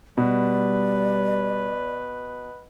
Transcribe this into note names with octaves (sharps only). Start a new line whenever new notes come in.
B2 G3 B4 D5